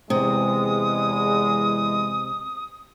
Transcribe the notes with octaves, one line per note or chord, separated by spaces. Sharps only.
E2 C3 G#3 D#6